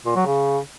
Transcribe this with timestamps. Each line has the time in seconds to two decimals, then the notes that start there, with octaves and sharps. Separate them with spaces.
0.06 A#2
0.16 F#3
0.26 C#3